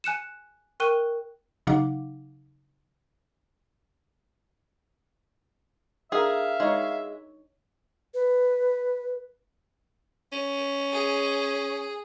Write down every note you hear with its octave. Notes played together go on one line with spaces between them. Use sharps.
G#5 F#6 C#7 E7
A#4 G5 C#6 F#6 D#7 G7
C#3 F#3 D#4 F5 F#5 D6
D4 G#4 A#4 E5 F5
G#3 D#4 C#5
B4
C#4
G#4